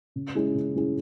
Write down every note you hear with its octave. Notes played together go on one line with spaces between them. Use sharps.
C#3
G#3 C#4 E4 G#4
C#3
G#3 C#4 E4 G#4